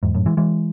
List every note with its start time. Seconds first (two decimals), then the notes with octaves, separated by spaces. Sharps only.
0.03 E2 G#2
0.15 F#2 A2
0.26 E3 G#3
0.37 E3 G#3